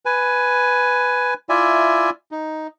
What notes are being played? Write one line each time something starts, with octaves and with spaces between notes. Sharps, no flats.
B4 G#5
E4 F4 D5 E5 G#5
D#4